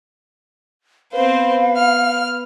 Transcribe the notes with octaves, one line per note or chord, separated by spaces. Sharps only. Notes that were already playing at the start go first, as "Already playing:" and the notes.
B3 C4 B4 C5 F5
F6